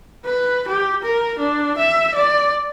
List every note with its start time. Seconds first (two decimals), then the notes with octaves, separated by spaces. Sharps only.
0.26 B4
0.68 G4
1.03 A#4
1.39 D4
1.78 E5
2.15 D5